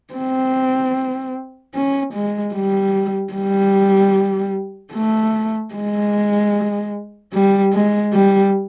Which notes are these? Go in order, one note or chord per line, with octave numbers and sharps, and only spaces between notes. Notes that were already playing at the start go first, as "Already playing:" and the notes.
C4
C#4
G#3
G3
G3
A3
G#3
G3
G#3
G3